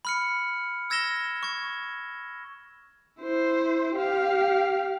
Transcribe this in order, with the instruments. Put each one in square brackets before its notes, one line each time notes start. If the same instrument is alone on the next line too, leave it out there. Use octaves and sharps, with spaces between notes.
[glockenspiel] B5 F6 C#7
E6 G#6 A#6 E7 G7
C#6 G#6
[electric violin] E4 C5
G4 F5